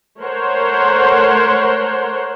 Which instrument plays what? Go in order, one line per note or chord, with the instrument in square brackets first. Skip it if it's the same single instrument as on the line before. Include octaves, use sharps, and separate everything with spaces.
[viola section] A3 A#4 C5 C#5 F#5 C6